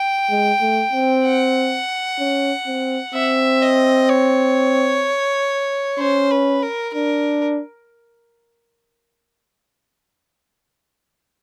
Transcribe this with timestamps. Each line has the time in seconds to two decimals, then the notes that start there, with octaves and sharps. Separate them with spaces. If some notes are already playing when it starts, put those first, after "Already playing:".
Already playing: G5
0.30 G#3
0.61 A3
0.92 C4
1.25 F#5
2.19 C#4
2.67 C4
3.14 C4 E5
3.62 D#5
4.09 C#5
5.98 C#4 C5
6.31 B4
6.62 A#4
6.94 D4 A#4